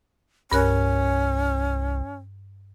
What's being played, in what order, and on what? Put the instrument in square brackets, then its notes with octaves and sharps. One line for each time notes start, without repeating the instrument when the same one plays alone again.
[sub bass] C2 [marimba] G2 A#4 F#6 [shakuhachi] C#4